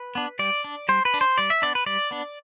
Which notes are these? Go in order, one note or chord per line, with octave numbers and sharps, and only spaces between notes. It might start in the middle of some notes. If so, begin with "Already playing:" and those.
Already playing: B4
B3 D4
G3 D5
D4
G3 C5
B4
D4
C5
G3 D5
E5
B3 D4 D5
B4
G3 D5
B3 D4